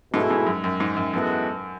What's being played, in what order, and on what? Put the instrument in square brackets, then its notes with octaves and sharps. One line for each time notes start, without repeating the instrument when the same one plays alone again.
[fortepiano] G#2 [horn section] B2 A3 E4 G#4
[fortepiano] G#2
F#2
F#2
G#2
F#2
[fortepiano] F#2 [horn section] E3 G#3 B3 F#4 A4